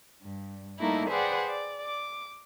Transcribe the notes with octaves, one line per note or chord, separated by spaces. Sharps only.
G2
G3 A3 A#3 D#4 E4
G#4 B4 C5 D5 F#5 G5
D5
D6